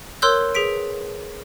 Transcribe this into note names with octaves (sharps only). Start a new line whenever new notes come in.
A#4 C#5 C6 E6 F#6 G6
G#4 B4 B6 D7